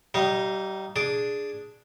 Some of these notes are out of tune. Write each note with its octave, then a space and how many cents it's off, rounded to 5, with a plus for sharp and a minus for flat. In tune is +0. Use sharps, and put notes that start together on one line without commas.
G3 -30 D#4 +0 F5 -25
D4 +0 G#4 +0 D6 +0